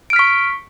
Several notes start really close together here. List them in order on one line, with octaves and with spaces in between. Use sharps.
D7 F6 B6 C#6